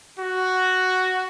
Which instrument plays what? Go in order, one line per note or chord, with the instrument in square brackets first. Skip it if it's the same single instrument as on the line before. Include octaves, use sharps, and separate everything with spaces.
[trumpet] F#4